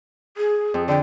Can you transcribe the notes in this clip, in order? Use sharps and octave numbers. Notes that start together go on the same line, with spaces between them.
G#4
F2
D3 G5